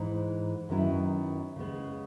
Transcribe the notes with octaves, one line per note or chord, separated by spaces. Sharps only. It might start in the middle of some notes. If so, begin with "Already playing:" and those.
Already playing: G#2 E3 G#3 D#4
F#2 D#3 F#3 B3 E4
C#3 G#3 B3